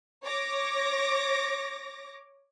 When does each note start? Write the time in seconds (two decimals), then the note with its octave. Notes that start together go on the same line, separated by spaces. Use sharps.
0.25 C#5 D6 A#6